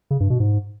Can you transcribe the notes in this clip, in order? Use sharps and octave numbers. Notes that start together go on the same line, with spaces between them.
C#3
G2
B2
G#2